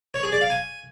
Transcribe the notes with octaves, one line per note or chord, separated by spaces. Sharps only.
C#5
G#4
D5
F5
G#5